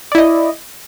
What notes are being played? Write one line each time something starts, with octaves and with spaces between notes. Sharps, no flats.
E4 D5 D#5